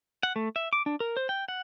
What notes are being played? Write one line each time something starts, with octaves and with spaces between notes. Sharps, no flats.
F#5
A3
E5
D6
D4
A#4
C5
G5
F#5